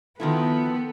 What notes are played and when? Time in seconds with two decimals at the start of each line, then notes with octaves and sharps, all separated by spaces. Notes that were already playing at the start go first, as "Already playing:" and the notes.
0.20 D#3 F3 B3 E4 A4